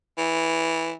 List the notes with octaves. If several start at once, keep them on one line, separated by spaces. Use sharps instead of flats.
E3